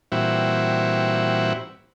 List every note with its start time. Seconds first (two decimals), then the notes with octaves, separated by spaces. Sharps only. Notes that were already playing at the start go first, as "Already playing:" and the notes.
0.12 A#2 E3 G3 C4 E4 F#4